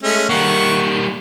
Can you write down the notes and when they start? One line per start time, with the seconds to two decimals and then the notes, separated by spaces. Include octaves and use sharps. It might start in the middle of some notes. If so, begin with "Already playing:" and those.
0.03 G#3 A3 C#4
0.30 D#3 G3 A#3 F#5 C#6